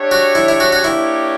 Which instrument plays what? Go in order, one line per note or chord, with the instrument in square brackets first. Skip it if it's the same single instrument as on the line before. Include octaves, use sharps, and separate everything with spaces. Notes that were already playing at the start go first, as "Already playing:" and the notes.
Already playing: [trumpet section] D4 G4 C#5 E5
[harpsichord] F#4
E4
E4
F#4
F#4
[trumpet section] A#3 D4 G4 C#5 [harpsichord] E4